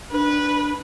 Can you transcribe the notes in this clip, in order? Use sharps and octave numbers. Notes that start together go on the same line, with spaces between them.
D4 B4